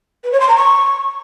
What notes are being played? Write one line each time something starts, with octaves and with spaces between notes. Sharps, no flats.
B4
C#5
C6
A#5
C#6